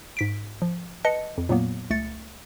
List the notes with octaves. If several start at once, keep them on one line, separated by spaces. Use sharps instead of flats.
G#2 B6 D7
F3
B4 D#5 A5 C#7
F2
A#2 F#3 A#3 B3
C#2 A3 A6 C#7